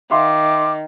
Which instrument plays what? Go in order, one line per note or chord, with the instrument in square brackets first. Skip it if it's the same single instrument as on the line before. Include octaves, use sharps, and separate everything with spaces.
[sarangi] D#3 [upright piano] E5 F5 C6 [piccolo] D6